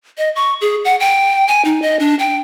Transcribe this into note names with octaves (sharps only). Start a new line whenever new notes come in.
D#5
C#6
G#4
F#5
G5
G#5
D#4
D#5
D4
G5